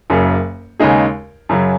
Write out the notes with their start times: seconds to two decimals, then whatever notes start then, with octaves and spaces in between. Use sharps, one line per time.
0.10 F#1 F#2 C#3
0.80 D#2 C#3 G#3 D#4 G#4
1.49 F#2 C#3 F#3